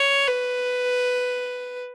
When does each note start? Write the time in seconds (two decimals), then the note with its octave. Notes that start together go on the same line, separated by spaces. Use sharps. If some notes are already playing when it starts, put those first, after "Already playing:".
Already playing: C#5
0.27 B4